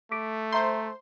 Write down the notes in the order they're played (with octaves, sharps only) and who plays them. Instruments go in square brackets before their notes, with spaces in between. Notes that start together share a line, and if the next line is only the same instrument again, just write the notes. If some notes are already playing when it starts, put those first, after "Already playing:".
[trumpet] A3 [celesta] D6 B6 D7
[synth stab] C5 C6 [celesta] E5 A#5 G6